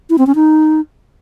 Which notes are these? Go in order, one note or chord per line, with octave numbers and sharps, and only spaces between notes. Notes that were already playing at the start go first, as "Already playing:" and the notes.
E4
C4
C#4
D#4